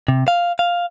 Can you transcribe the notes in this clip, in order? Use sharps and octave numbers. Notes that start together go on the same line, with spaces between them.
C3
F5
F5